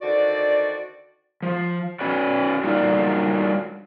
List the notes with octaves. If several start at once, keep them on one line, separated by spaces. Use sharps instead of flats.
D3 D#3 F#4 C5 D5
F3
C#4 F#4 B4 C#5 D5
F#3 G3 A#3 D4 D#4 F4